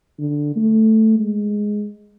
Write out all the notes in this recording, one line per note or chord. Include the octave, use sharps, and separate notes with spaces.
D3
A3
G#3